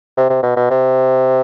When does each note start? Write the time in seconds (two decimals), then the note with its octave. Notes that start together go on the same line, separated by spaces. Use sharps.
0.17 C3
0.30 C3
0.43 B2
0.57 B2
0.71 C3